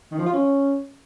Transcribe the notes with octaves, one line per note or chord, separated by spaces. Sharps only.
D#3
F3
F4
C#4